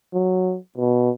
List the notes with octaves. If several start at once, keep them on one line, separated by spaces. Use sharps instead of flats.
F#3
B2